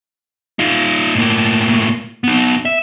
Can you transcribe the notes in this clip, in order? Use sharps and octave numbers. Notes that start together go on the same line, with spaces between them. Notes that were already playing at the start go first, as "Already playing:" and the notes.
D#4 F4
A2 A#3
B3 D#4
E5